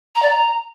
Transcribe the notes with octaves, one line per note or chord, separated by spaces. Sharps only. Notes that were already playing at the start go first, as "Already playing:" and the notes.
A#5
D5
A#5